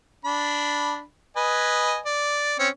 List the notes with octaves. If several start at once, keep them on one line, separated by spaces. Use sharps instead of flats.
D4 B5
B4 D#5 G#5
D5
C4 C#4 C#5